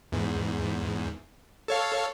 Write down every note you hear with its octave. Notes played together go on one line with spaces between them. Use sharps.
E2 G#2
A4 C#5 F5